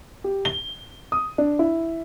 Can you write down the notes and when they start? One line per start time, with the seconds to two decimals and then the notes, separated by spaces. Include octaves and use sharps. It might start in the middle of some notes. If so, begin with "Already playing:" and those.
0.24 G4
0.45 G7
1.12 D#6
1.38 D4
1.59 E4